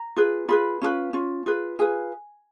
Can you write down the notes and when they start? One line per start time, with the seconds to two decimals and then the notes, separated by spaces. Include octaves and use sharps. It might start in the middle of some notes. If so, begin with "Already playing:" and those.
Already playing: A#5
0.16 F4 G#4 B4
0.48 F4 G#4 B4 B5
0.82 C#4 F4 G#4 B4
1.13 C#4 F4
1.46 F4 G#4 B4
1.79 F4 G#4 B4 G#5